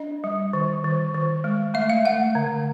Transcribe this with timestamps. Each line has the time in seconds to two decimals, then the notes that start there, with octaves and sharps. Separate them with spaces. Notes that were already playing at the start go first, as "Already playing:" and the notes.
Already playing: D4 D#5
0.24 G3
0.53 D#3
0.84 D#3
1.14 D#3
1.44 G#3
1.74 A3 E5
1.90 F5
2.05 A3 F#5
2.35 D3